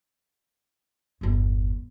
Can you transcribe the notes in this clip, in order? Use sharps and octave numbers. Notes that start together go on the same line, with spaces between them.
G1 E2